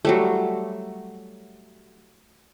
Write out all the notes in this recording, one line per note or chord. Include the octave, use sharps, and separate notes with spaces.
F#3 G3 A3